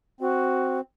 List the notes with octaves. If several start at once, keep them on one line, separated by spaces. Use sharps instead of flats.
C4 F#4